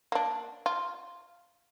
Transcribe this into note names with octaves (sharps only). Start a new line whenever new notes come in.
A#3 D4
F4